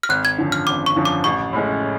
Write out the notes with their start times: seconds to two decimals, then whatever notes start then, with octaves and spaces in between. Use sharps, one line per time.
0.03 F6
0.09 G#1 F#6
0.25 G#6
0.38 F#2 D3 F3
0.52 F6
0.67 G#1 D6
0.86 C#6
0.96 F#2 D3 F3
1.05 D6
1.24 A1 C#6
1.53 A2 G#3 C#4